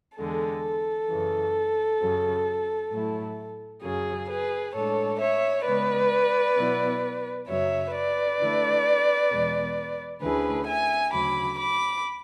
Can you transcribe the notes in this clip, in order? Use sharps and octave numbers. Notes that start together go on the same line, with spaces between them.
E2 D3 G#3 A4
F#2 C#3 E3
F#2 C#3 F#3
A2 F#3 A3 E4
F#2 C#3 F#3 G#4
G#4 B4
A2 G#3 D4 A4 C#5
C#5 E5
C#3 G#3 B3 B4 D5
B2 F#3 B3 E4
F#2 C#3 F#3 C#5 E5
B4 D5
D3 A3 E4
E2 B2 G#3
D2 D3 A3 C#4 E4 G#4 B4
E5 G#5
D2 C#3 F#3 B5 D6
B5 D6